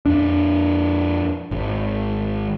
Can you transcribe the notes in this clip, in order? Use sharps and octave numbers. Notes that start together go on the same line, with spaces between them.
F2 D4
G#1